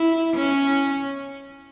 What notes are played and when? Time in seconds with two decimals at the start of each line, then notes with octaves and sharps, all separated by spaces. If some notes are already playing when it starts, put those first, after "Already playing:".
Already playing: E4
0.36 C#4